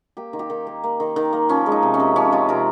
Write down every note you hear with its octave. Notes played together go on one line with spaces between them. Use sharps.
A#3 G4
D#3
G4
D#3
A#3
A#3
D#3
D#3
A#3
F3 C#4
G#3
D#4
C3
C#4
C3
F3 C#4
G#3 F4
C3 A#4